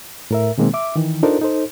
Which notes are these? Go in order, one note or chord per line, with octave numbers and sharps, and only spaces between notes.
A2 A#4 E5
B2 D#3 G#3 A#3 C4
E5 D6
D#3 E3
D4 D#4 F4 A4 A#4 C5
D#4 A4 C5